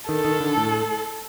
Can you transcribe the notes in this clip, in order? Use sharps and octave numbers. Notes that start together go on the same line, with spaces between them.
D#3 A4
D#3
D3
A2